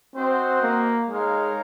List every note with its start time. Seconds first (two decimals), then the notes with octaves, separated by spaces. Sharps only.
0.15 C4 F#4 C5 D#5 F#5
0.62 A#3
1.09 G#3 D#4 A#4 C#5 F5